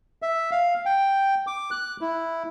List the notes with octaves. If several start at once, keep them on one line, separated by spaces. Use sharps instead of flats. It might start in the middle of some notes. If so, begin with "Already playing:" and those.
E5
F5
G5
D6
F#6
E4